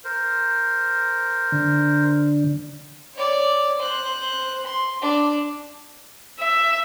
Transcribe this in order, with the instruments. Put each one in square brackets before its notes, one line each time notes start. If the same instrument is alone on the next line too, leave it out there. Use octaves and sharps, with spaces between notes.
[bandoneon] A#4 C5
[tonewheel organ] D3
[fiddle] C#5 D5
C5 F#6
C6
D4
[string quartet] E5